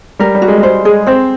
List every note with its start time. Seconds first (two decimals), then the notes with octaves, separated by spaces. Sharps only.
0.19 G3 A#4
0.35 G3
0.42 F#4
0.48 G#3
0.58 G3
0.63 G#3 C5
0.85 G#3 G#4
1.06 C4 C5